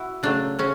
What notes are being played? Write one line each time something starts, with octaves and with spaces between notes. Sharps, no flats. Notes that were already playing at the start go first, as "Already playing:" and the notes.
Already playing: E4 F#4
C#3 F#3 A3 D4
C#3 C#4